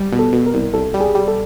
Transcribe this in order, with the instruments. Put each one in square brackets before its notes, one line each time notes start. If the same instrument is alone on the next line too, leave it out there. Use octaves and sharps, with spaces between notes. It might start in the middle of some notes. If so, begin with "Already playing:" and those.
Already playing: [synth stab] G3
B2
[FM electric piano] A4
[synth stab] B2
[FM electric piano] A#4
[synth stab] C2
[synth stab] C2 [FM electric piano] A4
[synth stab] G3
[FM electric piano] G#4
[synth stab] G3
[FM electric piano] A4